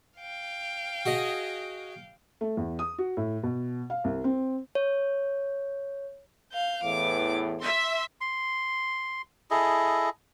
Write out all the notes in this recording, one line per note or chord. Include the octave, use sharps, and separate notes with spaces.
F5 G5
F#4 G#4 D#5
A3
E2
D#6
F#4
A2
B2
F5
C2
C4
C#5
F5 G6
E2 A2 E3 D6
E5 C6
C6
E4 G#4 A4 D#5